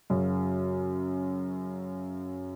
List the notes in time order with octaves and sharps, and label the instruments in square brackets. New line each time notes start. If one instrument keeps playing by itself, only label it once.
[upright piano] F#2 C#3 F#3